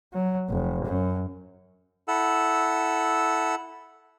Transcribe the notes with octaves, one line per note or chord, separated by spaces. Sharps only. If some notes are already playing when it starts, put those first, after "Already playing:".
F#3
F1
F#2
E4 A4 F#5 E6